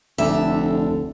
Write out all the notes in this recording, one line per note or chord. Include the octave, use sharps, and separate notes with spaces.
F1 D2 D3 E5